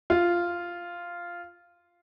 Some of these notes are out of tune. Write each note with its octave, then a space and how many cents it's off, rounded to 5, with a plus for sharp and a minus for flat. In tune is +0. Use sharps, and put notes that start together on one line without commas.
F4 -5